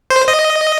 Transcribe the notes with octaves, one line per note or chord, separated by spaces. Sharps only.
C5
D#5